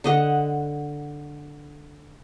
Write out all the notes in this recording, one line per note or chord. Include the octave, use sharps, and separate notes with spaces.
D3 D#5 F#5